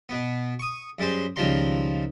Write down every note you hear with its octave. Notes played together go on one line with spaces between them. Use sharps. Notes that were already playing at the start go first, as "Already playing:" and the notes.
B2 B3
C#6 D#6
F#2 G3 G#3 C5
C#2 D#3 F3 G3 A#5 C6